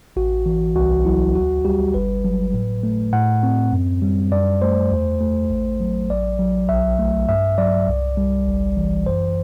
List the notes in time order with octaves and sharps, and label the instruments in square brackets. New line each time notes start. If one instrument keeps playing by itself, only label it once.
[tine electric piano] A1 F#4
E3
C2 F#4
F#3 E4
D2 F#4
G3 G4
G1 B4
F#3
A2
A3
A2 F#5
C4
F#2
G3
F#2 D5
A3 C5
E2
A3
A1
F#3
A1 D5
F#3
B1 E5
A3
G2 E5
F#3 D5
C2
G3
G1
E3
F#2 C5